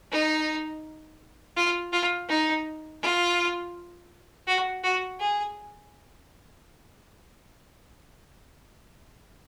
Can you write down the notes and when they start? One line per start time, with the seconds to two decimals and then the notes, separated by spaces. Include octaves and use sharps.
0.12 D#4
1.57 F4
1.93 F4
2.29 D#4
3.02 F4
4.47 F#4
4.84 F#4
5.20 G#4